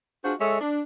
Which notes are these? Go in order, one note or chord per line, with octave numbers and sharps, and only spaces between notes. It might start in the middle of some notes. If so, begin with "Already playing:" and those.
D4 F4 F#4 G#4 C5
G#3 A4 C#5 D#5 E5
D4